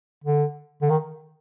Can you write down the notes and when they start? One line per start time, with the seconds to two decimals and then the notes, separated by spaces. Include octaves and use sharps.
0.24 D3
0.82 D3
0.90 D#3